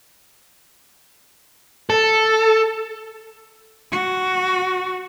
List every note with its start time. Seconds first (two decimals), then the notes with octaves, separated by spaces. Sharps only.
1.90 A4
3.92 F#4